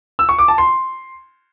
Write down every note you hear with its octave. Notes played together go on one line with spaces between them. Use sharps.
E6
C#6
D6
A5
C6